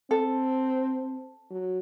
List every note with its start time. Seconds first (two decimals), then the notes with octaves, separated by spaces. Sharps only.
0.11 C4 A4
1.51 F#3